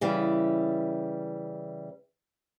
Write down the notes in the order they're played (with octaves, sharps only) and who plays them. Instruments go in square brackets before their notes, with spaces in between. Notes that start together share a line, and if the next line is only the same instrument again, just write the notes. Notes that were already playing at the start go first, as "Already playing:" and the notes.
[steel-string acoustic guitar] C#3 E3 G3